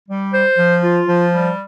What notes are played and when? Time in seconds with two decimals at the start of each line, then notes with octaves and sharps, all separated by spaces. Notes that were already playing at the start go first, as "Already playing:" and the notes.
0.08 G3
0.33 C5
0.57 F3
0.83 F4
1.07 F3
1.32 G3